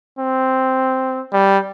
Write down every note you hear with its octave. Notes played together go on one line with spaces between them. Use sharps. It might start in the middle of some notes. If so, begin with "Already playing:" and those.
C4
G3